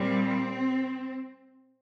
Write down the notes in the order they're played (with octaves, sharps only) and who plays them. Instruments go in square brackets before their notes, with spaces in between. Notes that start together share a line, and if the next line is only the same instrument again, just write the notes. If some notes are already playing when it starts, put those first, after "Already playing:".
Already playing: [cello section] A#2 G3 C4